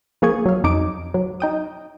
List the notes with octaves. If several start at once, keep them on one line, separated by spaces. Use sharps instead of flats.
F3 A#3 G#4 C#6 G#6
F#3 F5
F2 D#4 D#5 D6 D7
F#3
D#4 G5 D#6